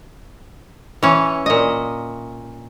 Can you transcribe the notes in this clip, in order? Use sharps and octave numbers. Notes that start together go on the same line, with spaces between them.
E3 C#4
A#2 D#5